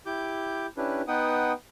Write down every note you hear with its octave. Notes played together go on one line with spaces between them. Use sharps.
E4 G4 D6 G6
C#4 D4 E4 G4 B4
B3 D#4 B4 F#5 G5 D#6